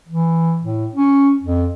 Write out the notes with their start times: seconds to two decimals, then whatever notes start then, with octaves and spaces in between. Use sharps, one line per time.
0.08 E3
0.63 A2
0.95 C#4
1.43 F2